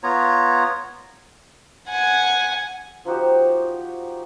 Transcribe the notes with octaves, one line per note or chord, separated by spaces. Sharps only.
B3 F4 C#5 A#5
F#5 G#5
F3 D#4 F#4 G4